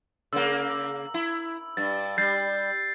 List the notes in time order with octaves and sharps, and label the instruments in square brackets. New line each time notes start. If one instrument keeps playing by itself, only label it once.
[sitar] C#3 A#3 [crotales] E6
[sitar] E4
[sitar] G2 [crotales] A6
[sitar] G3 [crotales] G6 A6 C7